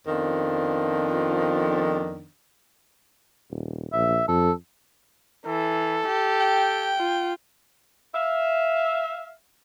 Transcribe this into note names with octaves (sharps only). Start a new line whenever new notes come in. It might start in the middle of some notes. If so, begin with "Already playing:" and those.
F2 D#3 F3 B3 D4
D#1
A#1 E5
F2 A4
E3 A4
G4
G5
F4
E5 F5